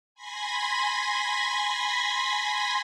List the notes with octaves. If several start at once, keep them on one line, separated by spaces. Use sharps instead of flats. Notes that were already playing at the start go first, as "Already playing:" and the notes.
G#5 B5 C6 G#6 A#6 B6